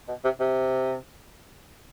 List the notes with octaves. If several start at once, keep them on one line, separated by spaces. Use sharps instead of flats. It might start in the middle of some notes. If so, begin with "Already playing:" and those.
B2
C3
C3